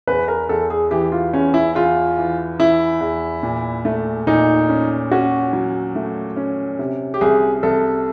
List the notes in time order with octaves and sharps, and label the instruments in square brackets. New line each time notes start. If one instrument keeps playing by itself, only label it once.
[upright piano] E2 [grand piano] B4
[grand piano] A#4
[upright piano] E2 [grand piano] A4
[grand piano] G#4
[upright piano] E3 [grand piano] G4
[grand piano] F4
[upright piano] E2 [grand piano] C#4
[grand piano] E4
[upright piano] E2 [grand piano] F4
[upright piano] E3
[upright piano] E3 [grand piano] E4
[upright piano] E2
A#2
A3
[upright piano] A#2 [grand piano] D#4
[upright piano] C#4
[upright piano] C#4 [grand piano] F#4
[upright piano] F#3
A3
C#4
C3
[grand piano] G4
[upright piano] C2 [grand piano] G#4
[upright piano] C2 [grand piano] A4